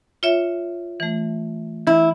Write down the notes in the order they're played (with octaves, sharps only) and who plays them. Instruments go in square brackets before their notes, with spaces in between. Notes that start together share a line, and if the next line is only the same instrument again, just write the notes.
[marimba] F4 C#5 E5
E3 A3
[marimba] E3 [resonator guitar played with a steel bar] E4